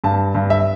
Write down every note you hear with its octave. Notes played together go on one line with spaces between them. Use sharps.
G2 A5
G2
E5